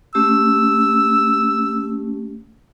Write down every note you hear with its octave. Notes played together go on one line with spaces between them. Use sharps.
A3 C#4 G4 E6